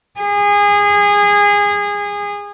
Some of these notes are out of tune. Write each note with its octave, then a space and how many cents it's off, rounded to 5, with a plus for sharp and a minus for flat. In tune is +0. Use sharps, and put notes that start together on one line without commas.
G#4 -25